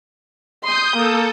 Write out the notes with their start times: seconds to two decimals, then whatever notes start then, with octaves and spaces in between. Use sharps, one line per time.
0.64 C6 D#6 G6
0.97 A#3 A4